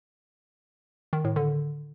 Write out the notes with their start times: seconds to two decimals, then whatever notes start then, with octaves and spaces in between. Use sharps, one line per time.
1.13 D#3
1.24 A2
1.36 D3